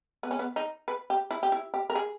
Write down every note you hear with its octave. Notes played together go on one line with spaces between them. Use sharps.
B3
C#4
B3
D#4
B4
G4
E4
G4
E4
G4
A#4
G#4